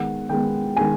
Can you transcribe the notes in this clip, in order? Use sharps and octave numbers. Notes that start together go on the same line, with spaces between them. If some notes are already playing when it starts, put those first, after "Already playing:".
Already playing: D#3 G#3 B3 F#5
D#3 G#3 B3 G5
D#3 G#3 B3 G#5